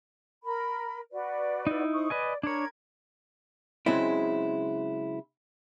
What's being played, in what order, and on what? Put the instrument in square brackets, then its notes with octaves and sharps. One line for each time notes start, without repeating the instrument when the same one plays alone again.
[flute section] A#4 B5
F#4 B4 D5
[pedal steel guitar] D#4 E4
[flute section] C5 C#6 D#6
[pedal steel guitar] B4 D#5 G#5 [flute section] D5
[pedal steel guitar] D4 C#5 [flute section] A#4 B5 G#6
[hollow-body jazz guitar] C#3 F#3 G#3 C4 E4